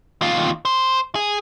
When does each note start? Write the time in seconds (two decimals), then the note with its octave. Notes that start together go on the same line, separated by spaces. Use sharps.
0.22 D#2 F4
0.65 C5
1.15 G#4